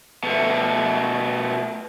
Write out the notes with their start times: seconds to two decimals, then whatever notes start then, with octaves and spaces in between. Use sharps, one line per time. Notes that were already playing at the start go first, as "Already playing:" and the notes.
0.23 B2 A3